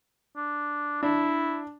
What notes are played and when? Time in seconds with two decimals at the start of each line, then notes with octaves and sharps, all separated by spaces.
0.37 D4
1.03 D4 E4